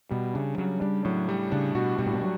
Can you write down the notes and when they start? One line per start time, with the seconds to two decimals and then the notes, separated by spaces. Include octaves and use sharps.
0.10 B2 G3
0.34 C#3 D4
0.58 C#3 F#3
0.81 G3 D4
1.05 A2 F#3
1.29 G3
1.52 C#3 D4
1.75 B2 F#4
1.99 B2 G3
2.06 A2
2.12 B2
2.22 F#3